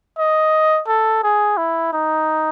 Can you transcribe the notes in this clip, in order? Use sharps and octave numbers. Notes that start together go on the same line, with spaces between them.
D#5
A4
G#4
E4
D#4